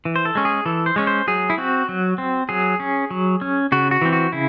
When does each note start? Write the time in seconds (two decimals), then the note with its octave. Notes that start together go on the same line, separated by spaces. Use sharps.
0.05 E3
0.16 C5
0.25 A4
0.35 G#3 C#4
0.45 G#4
0.66 E3 A4
0.86 C5
0.96 G#3 C#4 C#5
1.07 C5
1.27 F#3 G#4
1.50 E4
1.58 C4 F#4
1.89 F#3
2.18 C4
2.49 F#3 G#4
2.80 C#4
3.11 F#3
3.41 C#4
3.72 C#3 F#4
3.91 F#4
4.02 E3 C4
4.13 F#4
4.33 C#3 E4